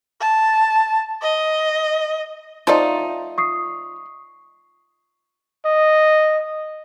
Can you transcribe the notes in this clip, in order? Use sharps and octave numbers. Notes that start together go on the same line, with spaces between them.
A5
D#5
F3 A3 D#4 F4 D5
C#6 D#6 C7
D#5